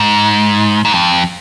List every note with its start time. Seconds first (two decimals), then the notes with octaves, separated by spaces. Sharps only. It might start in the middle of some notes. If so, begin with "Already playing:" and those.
Already playing: G#2
0.85 G#2
0.94 F2